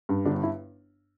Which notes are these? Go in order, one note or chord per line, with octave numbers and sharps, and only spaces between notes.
G2
G1 D4
E4